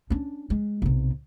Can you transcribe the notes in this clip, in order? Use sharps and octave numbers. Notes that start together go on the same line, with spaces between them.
C#4 D4
G#3
B1 C3